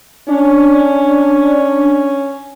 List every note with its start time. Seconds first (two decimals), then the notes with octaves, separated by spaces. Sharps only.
0.28 C#4 D4